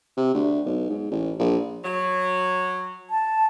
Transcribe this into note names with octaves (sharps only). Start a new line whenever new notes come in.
C3
D2
B1
G#2
A1
A#1
F#3
A5